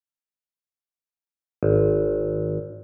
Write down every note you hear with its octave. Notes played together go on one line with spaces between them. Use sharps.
G#1